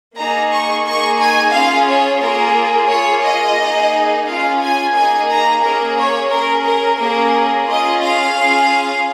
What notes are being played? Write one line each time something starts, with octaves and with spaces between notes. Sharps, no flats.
A#3 D#4 G#4 A#5
C#6
A#3 D#4 G#4 C#6
G#5
C#4 F4 G#4 F5
C#5
A#3 F4 G#4 A#4
A#3 F4 G#4 C#5
D#5
A#3 D#4 G#4
C#4 F4 G#4 F5
G#5
A#3 D#4 G#4 G#5
A#5
A#3 C#4 G#4 A#4
C#5
C#4 G#4 A#4
A#4
A#3 C#4 G#4 A#4
C#4 F4 G#4 D#5
F5
C#4 F4 G#4